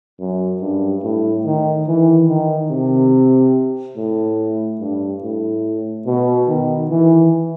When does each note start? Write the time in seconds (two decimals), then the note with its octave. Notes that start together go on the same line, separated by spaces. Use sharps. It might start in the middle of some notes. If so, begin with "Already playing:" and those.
0.19 F#2
0.61 G2
1.03 A2
1.46 D#3
1.87 E3
2.29 D#3
2.71 C3
3.96 A2
4.80 G2
5.22 A2
6.06 B2
6.47 D#3
6.90 E3